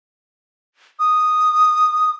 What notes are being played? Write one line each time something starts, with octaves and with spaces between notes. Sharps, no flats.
D#6